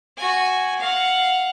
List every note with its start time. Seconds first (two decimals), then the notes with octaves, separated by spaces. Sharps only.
0.17 F#4 G#5
0.80 F5 F#5